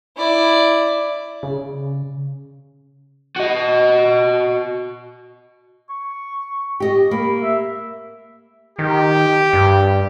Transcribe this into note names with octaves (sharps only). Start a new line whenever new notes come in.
E4 D5
C#3
F#4 D#5
C#6
G4 D#5
A#3 B5
E5
D#3 G4
G2